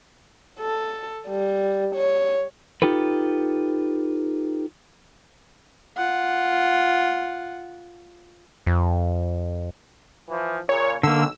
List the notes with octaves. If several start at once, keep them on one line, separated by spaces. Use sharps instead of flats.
A4
G3
C#5
D#4 F4 G4 A4 B4
F4 F#5
F2
E3 F3
A#2 C#3 C#5
B1 D3 A#3 E6